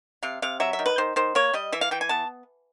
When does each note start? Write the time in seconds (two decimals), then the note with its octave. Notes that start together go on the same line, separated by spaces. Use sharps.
0.23 C3 F5
0.42 C3 F5
0.60 F#3 E5
0.73 E5
0.79 D#3
0.86 B4
0.98 D#3 C5
1.16 D#3 C5
1.35 A#3 C#5
1.54 G3 D#5
1.72 E3 E5
1.81 F5
1.91 E3 G5
2.01 G#5
2.09 B3 A5